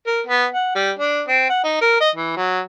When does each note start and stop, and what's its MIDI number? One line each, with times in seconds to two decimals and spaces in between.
0.06 0.21 70
0.27 0.45 59
0.54 0.71 78
0.75 0.91 55
0.99 1.22 62
1.28 1.45 60
1.49 1.60 78
1.64 1.79 63
1.81 1.98 70
2.00 2.10 75
2.16 2.33 52
2.36 2.60 54